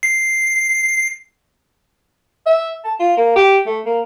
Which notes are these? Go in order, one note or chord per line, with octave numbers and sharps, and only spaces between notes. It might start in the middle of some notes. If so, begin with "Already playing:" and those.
C7
E5
A5
F4
A#3
G4
A3
A#3